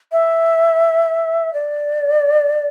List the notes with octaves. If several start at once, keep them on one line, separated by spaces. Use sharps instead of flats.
E5
D5